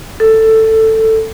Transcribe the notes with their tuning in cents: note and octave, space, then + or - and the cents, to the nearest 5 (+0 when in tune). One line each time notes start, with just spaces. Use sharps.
A4 +10